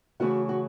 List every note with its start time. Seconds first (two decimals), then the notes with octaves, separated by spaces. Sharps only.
0.20 C#3 E3 A3 C#4 E4 F#4
0.49 F#4